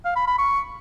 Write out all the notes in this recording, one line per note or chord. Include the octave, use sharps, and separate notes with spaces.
F5
B5
B5
C#6